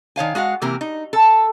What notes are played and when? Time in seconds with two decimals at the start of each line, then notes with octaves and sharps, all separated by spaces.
0.16 D#3 C#5 F5 G#5
0.35 G#3 F#4 F5 F#5
0.62 C3 E3 A#3 G4 A#4
0.81 D#4
1.13 A4